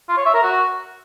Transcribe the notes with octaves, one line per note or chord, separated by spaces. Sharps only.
F4
C#5
E5
A#4
F#4